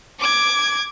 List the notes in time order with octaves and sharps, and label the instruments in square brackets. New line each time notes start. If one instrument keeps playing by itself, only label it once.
[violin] D6 G#6